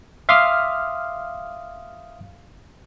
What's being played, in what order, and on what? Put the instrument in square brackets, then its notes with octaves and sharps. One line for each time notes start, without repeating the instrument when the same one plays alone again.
[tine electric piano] E5 F5 C6 D6 D#6 F6